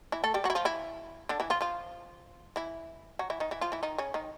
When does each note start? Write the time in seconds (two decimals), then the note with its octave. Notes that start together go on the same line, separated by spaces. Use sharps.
0.12 E3 E4
0.24 A3 A4
0.34 G3 G4
0.44 F#3 F#4
0.50 E4
0.55 F3 F4
0.65 E3 E4
1.29 D3 D4
1.40 E3 E4
1.50 F3 F4
1.61 F3 F4
2.56 E3 E4
3.19 F#3 F#4
3.30 E3 E4
3.40 D#3 D#4
3.51 E3 E4
3.61 F3 F4
3.72 E3 E4
3.83 D#3 D#4
3.98 C#3 C#4
4.14 D#3 D#4